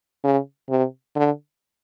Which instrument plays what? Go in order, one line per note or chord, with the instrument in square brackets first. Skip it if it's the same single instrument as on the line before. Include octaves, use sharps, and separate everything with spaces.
[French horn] C#3
C3
D3